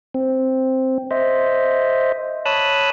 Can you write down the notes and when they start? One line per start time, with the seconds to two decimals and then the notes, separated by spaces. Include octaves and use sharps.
0.14 C4
1.11 C5 D#5 E5
2.46 C#5 A5 B5 D#6 E6 F#6